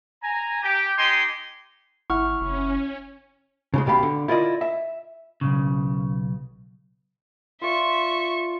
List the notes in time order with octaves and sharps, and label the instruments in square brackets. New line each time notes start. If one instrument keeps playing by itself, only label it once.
[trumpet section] G#5 A#5
G4
D#4 G4 D#5 G#5 C6
[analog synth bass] G#1 [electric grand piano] E4 F#5 [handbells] C#6 F6
[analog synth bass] F#1 [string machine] C#4
[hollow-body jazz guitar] C#3 F3 G#3
B1 B2 G4 F5 B5
D3
E4 F4 A#4 D5 D#5
E5
[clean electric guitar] B1 G#2 C#3
[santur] F4 D5 [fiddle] E5 C#6